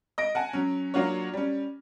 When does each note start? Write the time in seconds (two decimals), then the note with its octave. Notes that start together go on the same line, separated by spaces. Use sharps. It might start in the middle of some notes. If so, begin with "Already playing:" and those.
0.18 D#5 A#6 D7
0.35 F#5 G#5 A5
0.53 F#3 C#4
0.94 F#3 A#3 D4 F4 F#4 C#5
1.34 G3 C#4